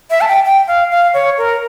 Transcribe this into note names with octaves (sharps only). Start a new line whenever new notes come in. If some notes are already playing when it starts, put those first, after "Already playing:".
E5
A5
G5
G5
F5
F5
C#5
A#4